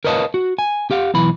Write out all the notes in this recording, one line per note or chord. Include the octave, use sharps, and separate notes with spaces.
A#4 B4 C#5 D#5 F5 A5
F#4
G#5
G4 F5 F#5
B1 E3 B5